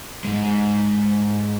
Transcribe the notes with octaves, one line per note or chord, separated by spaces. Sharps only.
G#2 G#3